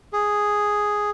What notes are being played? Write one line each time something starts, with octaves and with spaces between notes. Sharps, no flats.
G#4